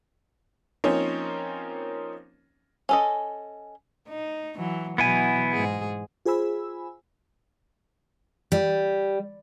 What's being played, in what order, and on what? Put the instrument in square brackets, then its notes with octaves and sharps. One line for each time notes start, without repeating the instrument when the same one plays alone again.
[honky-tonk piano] F3 A#3 C4 C#4 D#4 C#5
[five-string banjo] C#4 A4 D#5
[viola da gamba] D#4
E3 F#3
[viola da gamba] B2 E3 F#3 [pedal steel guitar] B3 E4 G#5
[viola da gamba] G#2 G#4
[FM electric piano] F4 G#4 C5 G#5 B5 E6
[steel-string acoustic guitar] G3